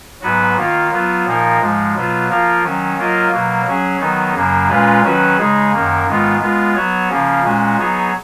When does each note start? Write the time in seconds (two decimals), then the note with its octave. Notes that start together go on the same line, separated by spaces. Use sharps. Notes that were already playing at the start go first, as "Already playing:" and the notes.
0.22 G#2 F#3 B3 F#4 B4
0.56 D#3 A#3 F4
0.91 F#3 B3 F4
1.26 A#2 F3 A#3 D#4 A#4
1.60 G#2 F3 G#3
1.94 B2 F#3 B3 F4
2.29 F3 A#3 F4 A#4
2.63 D#3 F#3 C#4
2.97 F#3 A#3 F4 A#4 D#5
3.31 B2 F#3 A#3
3.65 F#3 C#4 G#4
3.99 D#3 F#3 B3 D#4
4.34 F#2 C#3 F#3 A#3
4.68 A#2 G#3 C#4 F4 B4
5.03 D#3 F#3 C#4 F#4 B4
5.37 C#3 G#3 D#4 G#4
5.71 F#2 D#3 A#3
6.06 G#2 D#3 G#3 B3 F4
6.40 G#3 B3 F4
6.75 F#3 B3 F#4 C#5
7.09 C#3 F3 A#3 C#4
7.43 A#2 G#3 C#4 F#4
7.78 F#3 B3 D#4 G#4 C#5